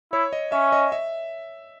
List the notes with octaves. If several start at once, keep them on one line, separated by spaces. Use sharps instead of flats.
E4 C#5
D#5
C#4 E5
D#5
E5